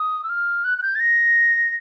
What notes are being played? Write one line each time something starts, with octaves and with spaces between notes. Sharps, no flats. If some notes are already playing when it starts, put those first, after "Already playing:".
Already playing: D#6
E6
F6
F#6
F#6
G6
A6
A#6